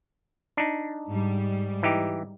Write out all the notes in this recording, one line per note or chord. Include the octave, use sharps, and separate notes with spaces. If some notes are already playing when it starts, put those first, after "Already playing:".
D4 D#4
G#2 G3
E3 D#4 G4